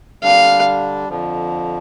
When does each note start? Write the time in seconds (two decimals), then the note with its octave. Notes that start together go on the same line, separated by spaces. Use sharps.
0.23 D3 G3 D4 F5
1.09 F2 D3 F3